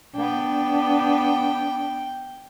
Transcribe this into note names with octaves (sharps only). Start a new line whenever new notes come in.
B3 D4 G5